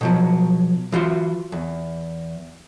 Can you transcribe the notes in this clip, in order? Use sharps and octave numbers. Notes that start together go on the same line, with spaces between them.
B2 F3 F#3
E3 F4 F#4 C6
E2